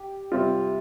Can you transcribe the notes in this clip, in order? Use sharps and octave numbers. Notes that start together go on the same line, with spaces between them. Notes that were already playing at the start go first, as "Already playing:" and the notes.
Already playing: G4
C3 G3 C4 F4